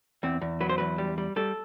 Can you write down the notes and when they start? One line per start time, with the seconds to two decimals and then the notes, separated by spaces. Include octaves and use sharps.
0.23 E2 C4
0.41 E2
0.60 F#3 B4
0.69 C5
0.78 E2 B4
0.98 G3
1.18 G3
1.36 G3 A4